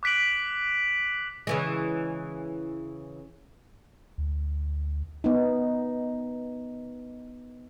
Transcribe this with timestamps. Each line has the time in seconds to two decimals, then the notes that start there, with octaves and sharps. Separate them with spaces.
0.03 D6 F#6 B6 D7 F#7
1.47 C#3 E3 G#3
4.18 D2
5.24 B3 D#4